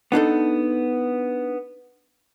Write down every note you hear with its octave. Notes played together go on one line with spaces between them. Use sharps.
B3 D4 D#4 A4